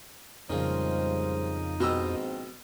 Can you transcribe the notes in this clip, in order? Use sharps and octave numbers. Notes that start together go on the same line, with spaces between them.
F2 A#2 C#3 F3 G3 G#3 D#4 C5
A#1 G#2 B2 C4 G4 A#4 D#5 E6